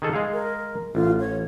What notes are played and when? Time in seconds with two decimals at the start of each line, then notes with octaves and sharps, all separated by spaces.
0.02 D#3 G#4 A4
0.13 G#3 G#4 F5
0.33 A#4
0.95 A1 F4
1.20 C#5